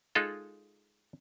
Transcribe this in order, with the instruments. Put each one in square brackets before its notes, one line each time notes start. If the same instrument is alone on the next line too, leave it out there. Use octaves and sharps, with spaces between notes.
[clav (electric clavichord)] G#3 D#4 F4 A4